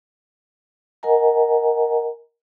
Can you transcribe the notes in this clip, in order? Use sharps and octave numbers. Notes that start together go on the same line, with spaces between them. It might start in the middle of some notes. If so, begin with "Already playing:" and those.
A#4 D#5 F#5 G#5 A#5